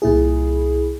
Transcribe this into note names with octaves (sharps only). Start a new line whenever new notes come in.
C2 A#2 E4 G#4